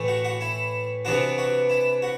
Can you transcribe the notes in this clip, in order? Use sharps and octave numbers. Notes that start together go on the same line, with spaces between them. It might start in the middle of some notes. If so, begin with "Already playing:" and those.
Already playing: A2 E3 A3
F#4
F#4
E4
C3 E3 B3 D4 F#4
F#4
E4
F#4